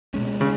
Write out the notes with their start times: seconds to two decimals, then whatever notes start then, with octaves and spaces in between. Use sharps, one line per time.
0.14 B2 G#3 C#4
0.41 C#3